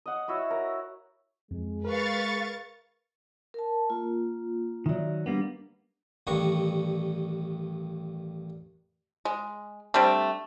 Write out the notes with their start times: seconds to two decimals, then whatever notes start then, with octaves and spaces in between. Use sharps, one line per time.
0.06 D#5 F#5
0.28 E4 F#4 C#5 E5
0.51 A#4
1.51 F2 G#3
1.85 A#4 B4 F5 C#6 A6
3.54 A#4 A5
3.90 A#3 F4
4.86 D#3 F#3 D5 E5
5.26 G3 A#3 B3 D4
6.27 A1 G2 D#3 D4 A#5 C#6
9.25 G#3
9.94 G3 A3 C4 D4